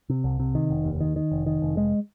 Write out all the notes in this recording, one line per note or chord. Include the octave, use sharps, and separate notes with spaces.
C3
C2
C3
D#3
F1
D#2
D#3
D#3
F1
D#3
F1
G#3